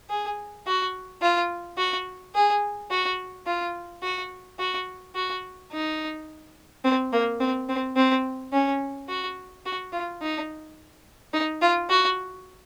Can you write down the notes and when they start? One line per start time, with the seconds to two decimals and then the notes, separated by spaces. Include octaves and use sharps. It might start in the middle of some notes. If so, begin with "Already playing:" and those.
0.10 G#4
0.67 F#4
1.22 F4
1.78 F#4
2.35 G#4
2.91 F#4
3.46 F4
4.03 F#4
4.59 F#4
5.15 F#4
5.72 D#4
6.84 C4
7.13 A#3
7.40 C4
7.69 C4
7.96 C4
8.53 C#4
9.08 F#4
9.66 F#4
9.93 F4
10.22 D#4
11.33 D#4
11.62 F4
11.90 F#4